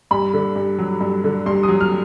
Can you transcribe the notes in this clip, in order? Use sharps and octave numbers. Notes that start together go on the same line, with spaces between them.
G2 B5
D3
G2
F#3
G2
D3
G2 C6
D#6
F#3
F6